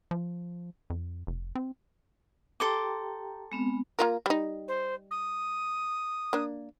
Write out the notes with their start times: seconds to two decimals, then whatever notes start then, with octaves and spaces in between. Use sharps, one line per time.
0.11 F3
0.90 F2
1.27 F1
1.55 C4
2.60 G4 A4 G5 A#5 C6 D6
3.52 G#3 B3 C4
3.99 A#3 F4 A#4
4.26 G3 D#4
4.68 C5
5.10 D#6
6.33 A#3 D4